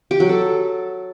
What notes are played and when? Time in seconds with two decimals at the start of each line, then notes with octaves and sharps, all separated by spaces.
0.11 G4
0.20 F#3
0.29 A4